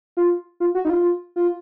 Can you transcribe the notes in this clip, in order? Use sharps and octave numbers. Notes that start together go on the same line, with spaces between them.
F4
F4
F#4
D#4
F4
F4